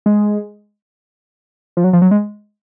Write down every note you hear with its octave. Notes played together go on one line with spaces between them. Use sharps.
G#3
F3
F#3
F3
F#3
G#3